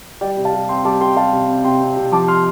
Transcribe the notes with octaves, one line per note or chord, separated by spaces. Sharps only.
G3 D5 G5
C3
F5 A5
G3
C4 G5 C6
G3 A5 D6
G3 G5 C6
G3 F5 A5
C3
C4
C3 G5 C6
C4
C3
F3 A5 D6
C6 F6